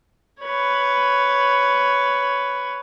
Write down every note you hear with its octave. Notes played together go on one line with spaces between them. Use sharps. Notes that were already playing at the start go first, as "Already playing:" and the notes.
B4 C#5